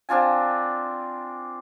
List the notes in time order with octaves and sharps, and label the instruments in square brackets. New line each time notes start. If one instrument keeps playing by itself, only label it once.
[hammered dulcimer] C4 D4 F4 G#5